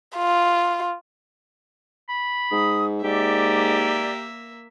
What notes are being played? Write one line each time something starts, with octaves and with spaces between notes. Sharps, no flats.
F4
B5
G#2 D#6
G#2 A#3 G4 D5 E5